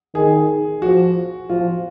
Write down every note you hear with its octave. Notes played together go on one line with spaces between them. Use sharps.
D#3 G#4
F3 F#4
F3 F4